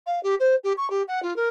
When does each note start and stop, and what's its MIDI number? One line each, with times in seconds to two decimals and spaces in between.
0.06 0.22 77
0.23 0.35 67
0.40 0.55 72
0.64 0.73 67
0.77 0.90 85
0.90 1.03 67
1.08 1.22 78
1.22 1.36 65
1.36 1.48 70